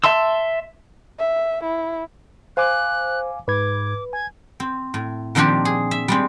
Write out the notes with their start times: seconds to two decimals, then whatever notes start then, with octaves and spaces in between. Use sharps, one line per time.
0.04 E5 A5 C6 E6
1.19 E5
1.63 E4
2.57 C5 F5 G#5 D6 F#6
3.48 G#2 B4 D6 G#6
4.13 G#5 G#6
4.60 C4
4.94 A2
5.35 A#2 D#3 F3 C4 D4 G4
5.65 G#4
5.91 E5
6.08 G3 G#3 C4